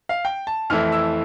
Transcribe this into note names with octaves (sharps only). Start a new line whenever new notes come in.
F5
G5
A5
F2 E3 A3 E4 F6
E6